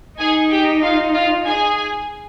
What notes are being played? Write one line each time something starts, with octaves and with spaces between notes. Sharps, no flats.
D#4 G#4 G#5
G4 G5
F4 F5
F4 F5
G#4 G#5